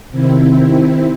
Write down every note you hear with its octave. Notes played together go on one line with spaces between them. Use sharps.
C3 D#3 C4 E4